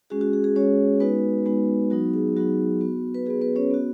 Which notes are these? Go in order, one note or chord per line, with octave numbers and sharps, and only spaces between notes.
G#3 C#4 F#4 G#4
F#4
G#4
G#4
G#3 C#4 F#4 C#5
G#3 B3 D#4 F#4 B4
G#3 B3 D#4 F#4
F#3 B3 D#4 F#4
G#4
F#3 B3 D#4 F#4
B3 F#4
B4
B3 F#4 G#4
B3 B4
C#4 C#5
B3 F#4